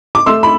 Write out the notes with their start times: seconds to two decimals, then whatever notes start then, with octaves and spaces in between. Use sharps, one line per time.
0.15 D6
0.26 A3 C6 E6
0.43 B5